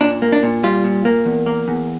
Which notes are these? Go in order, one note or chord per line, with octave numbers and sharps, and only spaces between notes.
A#2 D4
A#3
D4
A#2
G3 F4
A#2
A#3
E2
A#3
E2